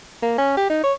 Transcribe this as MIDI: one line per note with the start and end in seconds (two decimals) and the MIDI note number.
0.22 0.37 58
0.38 0.55 61
0.57 0.69 67
0.70 0.79 63
0.84 0.93 73